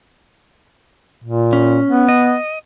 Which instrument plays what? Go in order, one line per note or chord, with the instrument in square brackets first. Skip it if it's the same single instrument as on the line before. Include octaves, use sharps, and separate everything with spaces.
[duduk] A#2
[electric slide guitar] C#4
[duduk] B3
[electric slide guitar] D#5